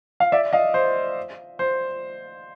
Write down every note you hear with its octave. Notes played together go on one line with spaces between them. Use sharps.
F5
D5 E5
D#5 F5
C5
C5